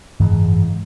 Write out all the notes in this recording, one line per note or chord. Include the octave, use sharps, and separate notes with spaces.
F#1 G#2 E3 G#3